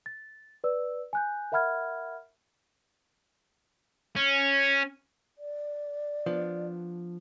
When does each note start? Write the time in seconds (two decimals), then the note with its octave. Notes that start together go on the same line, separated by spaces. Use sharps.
0.06 A6
0.64 B4 D5 E6
1.13 G#5 F#6 G6
1.52 A#4 E5 F#5 B5 F6 G#6
4.16 C#4
5.37 D5
6.26 F3 B3 D4